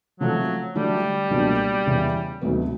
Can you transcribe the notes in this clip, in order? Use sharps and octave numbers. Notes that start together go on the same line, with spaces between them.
C#3 F3 F#3 A3 C4
D3 F#3 G3 A3 D4 F#4
C#2 B2 F#3 A#3 D4
E2 C#3 E3
D2 C3 D#3 F#3 B3